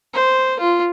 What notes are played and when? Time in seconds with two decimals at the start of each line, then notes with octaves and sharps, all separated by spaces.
0.14 C5
0.60 F4